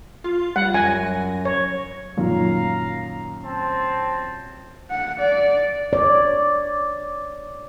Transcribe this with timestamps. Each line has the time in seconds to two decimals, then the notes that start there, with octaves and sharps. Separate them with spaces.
0.24 F4 F5
0.56 G3 F#5
0.74 F#2 G#5 A#6
1.45 C#5
2.17 F#2 A#2 D#3 F5 A#5
3.45 C4 A5
4.91 F#5
5.19 D5
5.93 C#5 D5